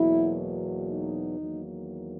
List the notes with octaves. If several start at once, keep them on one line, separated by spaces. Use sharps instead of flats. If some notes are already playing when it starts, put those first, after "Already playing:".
Already playing: E2 B2 F#3 A#3 E4
D#4
E2 D#3 F#3 A#3